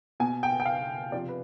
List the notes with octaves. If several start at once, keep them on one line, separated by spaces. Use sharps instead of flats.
B2 G#5
G5
G5
F5
C3 F3 D5
B4